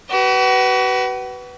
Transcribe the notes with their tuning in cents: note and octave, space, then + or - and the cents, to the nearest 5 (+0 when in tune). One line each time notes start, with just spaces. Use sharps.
F#4 +40 B4 +0